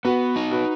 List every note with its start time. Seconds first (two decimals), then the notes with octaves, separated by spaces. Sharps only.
0.04 B3 F#4 B4
0.36 D#4
0.51 F#4 B4